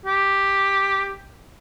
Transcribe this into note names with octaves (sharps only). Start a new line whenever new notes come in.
G4